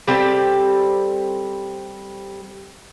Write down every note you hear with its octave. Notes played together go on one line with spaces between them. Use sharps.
G3 C4 G4 A4